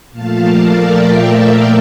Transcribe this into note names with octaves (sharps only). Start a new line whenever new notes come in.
A#2 F3 A3 F5 A5
A#4 D5
E5 G5
F5 A5
F5 A5